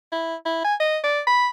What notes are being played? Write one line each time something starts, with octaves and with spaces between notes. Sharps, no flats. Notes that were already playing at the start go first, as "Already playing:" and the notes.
E4
E4
G#5
D#5
D5
B5